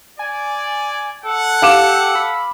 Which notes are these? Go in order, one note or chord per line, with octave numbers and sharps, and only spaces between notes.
D5 G#5
A4 F#5
G4 F5 D6 E7
B5